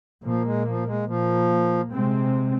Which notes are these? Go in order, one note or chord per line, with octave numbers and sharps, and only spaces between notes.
A#2 F3 A#3
G#3
F3
G#3
A#2 F3 A#3
C3 G#3 C4